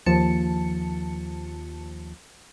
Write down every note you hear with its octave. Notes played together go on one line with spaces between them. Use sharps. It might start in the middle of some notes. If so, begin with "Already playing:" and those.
D#2 F3 A5 C#7